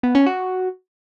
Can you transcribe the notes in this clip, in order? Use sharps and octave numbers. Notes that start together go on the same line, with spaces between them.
B3
C#4
F#4